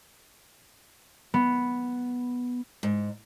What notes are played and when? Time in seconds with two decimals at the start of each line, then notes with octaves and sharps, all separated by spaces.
1.34 B3
2.83 G#2